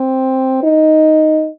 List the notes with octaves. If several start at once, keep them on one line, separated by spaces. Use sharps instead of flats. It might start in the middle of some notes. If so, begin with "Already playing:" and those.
Already playing: C4
D#4